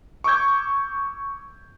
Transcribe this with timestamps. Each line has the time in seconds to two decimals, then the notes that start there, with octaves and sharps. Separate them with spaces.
0.24 C#6 D6 E6 G6 G#6